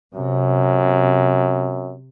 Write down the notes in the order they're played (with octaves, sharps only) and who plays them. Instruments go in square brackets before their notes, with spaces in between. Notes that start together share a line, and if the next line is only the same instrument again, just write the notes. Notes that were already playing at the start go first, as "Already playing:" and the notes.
[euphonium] F#2 [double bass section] C3